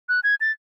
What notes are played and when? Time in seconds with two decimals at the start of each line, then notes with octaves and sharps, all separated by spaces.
0.09 F#6
0.24 G#6
0.41 A6